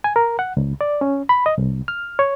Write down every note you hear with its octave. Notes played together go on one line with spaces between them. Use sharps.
G#5
A#4
F#5
C#2
D5
C#4
B5
D#5
C2
F6
C#5